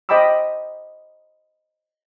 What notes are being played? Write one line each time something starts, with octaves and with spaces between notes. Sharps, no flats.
C5 D#5 G5 B5 D6 E6